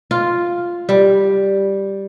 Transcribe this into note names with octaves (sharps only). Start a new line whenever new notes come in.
F4
G3